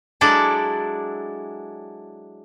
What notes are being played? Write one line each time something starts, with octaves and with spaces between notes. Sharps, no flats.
F#3 G#3 D4 E4 A4 D5